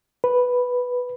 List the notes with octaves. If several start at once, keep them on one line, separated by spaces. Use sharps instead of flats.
B4